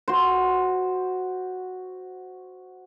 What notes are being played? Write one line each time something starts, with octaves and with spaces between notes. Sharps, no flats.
F#4 C5